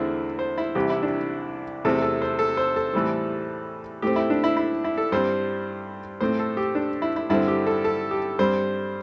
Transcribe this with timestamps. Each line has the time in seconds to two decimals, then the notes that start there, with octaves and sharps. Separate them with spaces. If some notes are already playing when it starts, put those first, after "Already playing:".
Already playing: E2 D3 A3 C4 E4
0.39 C5
0.58 E4
0.75 C2 C3 E3 G4
0.90 E4
1.03 D4
1.85 E2 C3 A3 C4 A4
2.02 A4
2.22 C5
2.39 A4
2.57 C5
2.76 A4
2.94 A2 E3 G3 C4
4.02 A2 A3 C4 G4
4.16 E4
4.30 D4
4.44 E4
4.57 E4
4.84 E4
4.98 A4
5.12 G2 G3 C4 C5
6.21 A2 A3 C4 C5
6.39 A4
6.57 G4
6.75 D4
7.02 E4
7.16 E4
7.30 G2 D3 C4 E4
7.48 G4
7.67 A4
7.85 A4
8.11 G4
8.39 G2 G3 C4 C5